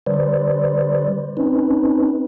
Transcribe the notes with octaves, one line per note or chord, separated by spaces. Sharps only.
D3 G3 B4 C5 D5
C4 C#4 D#4 B4